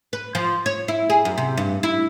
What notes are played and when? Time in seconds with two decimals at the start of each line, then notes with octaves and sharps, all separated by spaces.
0.13 B4
0.35 F3
0.66 C#5
0.88 E4
1.10 G#4
1.25 F#2
1.38 C3
1.57 G2
1.83 E4